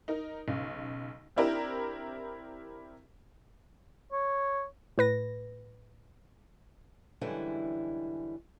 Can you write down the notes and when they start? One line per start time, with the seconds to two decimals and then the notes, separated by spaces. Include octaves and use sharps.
0.08 D#4 A#4
0.48 B1 C#3
1.36 C4 D4 E4 G4 A#4
4.13 C#5
4.98 A2 B4 A#6
7.21 F#2 D3 E3 G3 G#3 E4